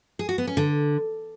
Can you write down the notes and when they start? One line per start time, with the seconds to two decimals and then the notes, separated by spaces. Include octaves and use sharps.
0.19 G#4
0.29 F#4
0.38 B3
0.47 C#4
0.57 D3